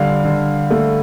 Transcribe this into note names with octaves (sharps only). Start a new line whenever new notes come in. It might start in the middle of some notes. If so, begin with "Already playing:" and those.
Already playing: D3 G3 F5
D3
A3